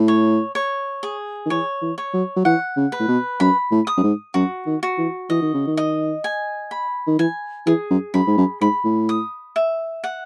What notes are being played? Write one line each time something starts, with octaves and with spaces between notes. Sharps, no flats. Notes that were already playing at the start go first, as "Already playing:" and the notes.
Already playing: A2
C#5
C#5
G#4
D#3
E3 C#5
E3
C#5
F#3
F#3
E3 F#5
C#3
B4
A2
B2
F#2 B5
A2
D#6
F#2
G#2
F#2 F#4
D#3
F#4
E3
E3 D#5
D#3
C#3
D#3
D#5
G#5
B5
D#3
E3 G#5
E3 G#4
F#2
F#2 B5
G#2
F#2
G#2 B5
A2
D#6
E5
F#5